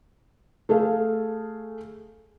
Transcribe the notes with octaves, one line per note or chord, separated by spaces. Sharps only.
A3 G#4 A4 F5